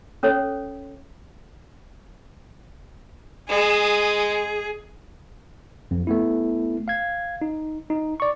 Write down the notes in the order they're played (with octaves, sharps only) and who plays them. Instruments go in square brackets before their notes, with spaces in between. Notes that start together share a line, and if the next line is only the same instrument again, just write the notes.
[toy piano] C#4 A4 C#5
[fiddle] G#3 [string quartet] G#4
[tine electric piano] F2
A3 B3 E4
F5 G#6
D#4
D#4
D5 C#6